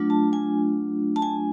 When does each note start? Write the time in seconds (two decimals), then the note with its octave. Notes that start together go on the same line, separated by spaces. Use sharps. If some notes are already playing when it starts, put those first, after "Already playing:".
Already playing: F#3 A3 D4 F4
0.10 A5
0.33 G#5
1.16 A5
1.22 G#5